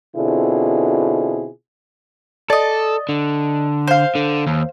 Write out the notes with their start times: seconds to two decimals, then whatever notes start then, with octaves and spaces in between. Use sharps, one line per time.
0.16 B2 D3 C4 E4 F4 G#4
2.50 A4 D5 D#5
3.09 D3
3.87 C5 F5
4.15 D3
4.47 D#2